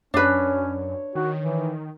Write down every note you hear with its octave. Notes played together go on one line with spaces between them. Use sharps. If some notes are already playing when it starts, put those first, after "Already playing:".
F#2 C#4 D4 B4 C#5
D#3 F#4
E3